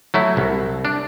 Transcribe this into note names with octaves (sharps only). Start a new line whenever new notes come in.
F#3 A3 E4
C2
D4